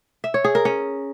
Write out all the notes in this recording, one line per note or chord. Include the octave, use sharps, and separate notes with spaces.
E5
C#5
G#4
A#4
C#4